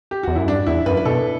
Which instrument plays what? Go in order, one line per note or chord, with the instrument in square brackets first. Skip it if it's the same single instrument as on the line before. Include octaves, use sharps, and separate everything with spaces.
[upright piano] G4
[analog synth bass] E2 [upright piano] F#4
[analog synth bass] F#2 [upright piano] E4
[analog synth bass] G2 [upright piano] D4
[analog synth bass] E2 [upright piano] E4
[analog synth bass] F#2 [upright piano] B4
[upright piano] B4
[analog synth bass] B2 [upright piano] A4